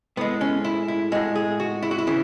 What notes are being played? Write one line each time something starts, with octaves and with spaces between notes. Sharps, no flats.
A2 G#3 B3
C#4
E4
E4
A2 G#3 F#4
G#4
F#4
E4
F#4
E4
C#3 E3